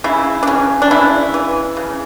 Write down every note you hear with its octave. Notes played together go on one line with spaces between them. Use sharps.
C#3 E4
D4
C#3 C#4
D4
C#3 E4
E3
C#3